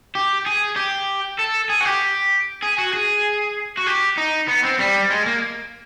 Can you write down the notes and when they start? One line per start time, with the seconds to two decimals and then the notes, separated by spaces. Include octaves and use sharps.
0.15 G4
0.46 G#4
0.76 G4
1.39 A4
1.69 G#4
1.80 F#4
1.85 G4
2.62 G#4
2.78 F#4
2.93 G#4
3.78 F#4
3.87 G4
4.17 D#4
4.48 B3
4.64 C4
4.80 G3
5.10 G#3
5.26 A#3